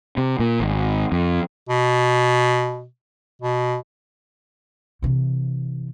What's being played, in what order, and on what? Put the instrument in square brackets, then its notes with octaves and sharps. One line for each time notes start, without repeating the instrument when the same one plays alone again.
[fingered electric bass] C3
A#2
G#1
F2
[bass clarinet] B2
B2
[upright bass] C3 E3